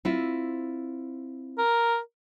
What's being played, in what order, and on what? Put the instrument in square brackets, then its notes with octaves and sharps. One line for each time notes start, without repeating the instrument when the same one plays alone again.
[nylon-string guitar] C4 E4 F4
[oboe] A#4